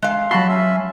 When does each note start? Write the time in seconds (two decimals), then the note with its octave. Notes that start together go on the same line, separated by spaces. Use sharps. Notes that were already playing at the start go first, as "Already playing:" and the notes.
0.02 G#3 F5
0.31 F#3 F#4 A5 B5 C6
0.49 C#4 E5